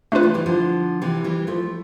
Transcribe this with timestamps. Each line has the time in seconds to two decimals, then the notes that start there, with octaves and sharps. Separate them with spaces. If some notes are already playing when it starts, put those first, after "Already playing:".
0.12 B2 D3 A3 D4 F4 B4
0.23 C3 E3
0.34 E3 G3
0.46 D3 F3
1.02 C3 E3
1.24 E3 G3
1.47 F3 A3